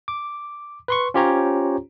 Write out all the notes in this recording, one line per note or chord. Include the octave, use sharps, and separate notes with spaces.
D6
B4 C6 C#6
C#4 F4 G4 C5 C#5 A#5